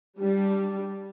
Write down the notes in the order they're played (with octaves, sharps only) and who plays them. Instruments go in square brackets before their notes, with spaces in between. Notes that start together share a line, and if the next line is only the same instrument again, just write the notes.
[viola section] G3 D4